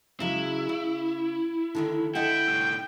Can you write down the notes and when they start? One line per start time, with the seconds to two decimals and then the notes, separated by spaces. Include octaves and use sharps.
0.20 C#3 F#3 G#3 E4
0.69 C#3
1.75 D3 D#3 A3
2.15 D3 E4 D#5 F#5 G5
2.48 C2 A2